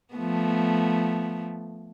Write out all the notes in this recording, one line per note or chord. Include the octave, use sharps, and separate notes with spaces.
F3 A3 B3